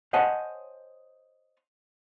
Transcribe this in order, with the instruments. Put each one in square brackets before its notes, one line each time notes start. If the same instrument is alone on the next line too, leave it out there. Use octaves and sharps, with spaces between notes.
[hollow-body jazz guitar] C5 C#5 D#5 F#5 G#5 A5